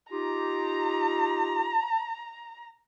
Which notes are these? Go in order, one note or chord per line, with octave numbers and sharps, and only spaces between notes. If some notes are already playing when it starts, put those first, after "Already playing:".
D#4 F4 G4 A#5